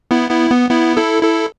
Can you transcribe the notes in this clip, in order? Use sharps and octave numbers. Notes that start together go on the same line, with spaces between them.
B3 E4
B3 E4
B3
B3 E4
E4 A4
E4 A4